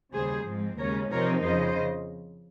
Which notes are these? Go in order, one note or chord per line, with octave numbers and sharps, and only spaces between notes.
D#2 C#3 G3 G#4 C5
G#2 F3 G#3 C4
D#2 C#3 G#3 C#4 A#4 C#5
C3 F3 C4 D#4 A#4 C#5
F2 C#3 F3 C5 D#5